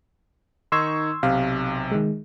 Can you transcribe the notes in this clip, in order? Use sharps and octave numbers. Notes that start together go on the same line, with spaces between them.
D#3 D#4 C6 C#6 E6 G#6
B1 C3 F5
D#3 G#3